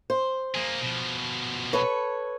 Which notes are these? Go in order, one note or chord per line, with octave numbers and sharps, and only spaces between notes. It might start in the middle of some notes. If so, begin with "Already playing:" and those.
C5
A#3 G#4
B2 F3
A4 B4 C#5